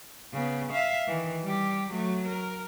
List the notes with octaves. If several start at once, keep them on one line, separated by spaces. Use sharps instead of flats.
C#3 B3
E5 F5
D#3 E3
G3 G4
F#3 A3
A#4